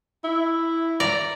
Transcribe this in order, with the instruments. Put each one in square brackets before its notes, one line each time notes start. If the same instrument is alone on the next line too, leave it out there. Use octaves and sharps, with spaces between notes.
[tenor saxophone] E4
[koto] D5 A#5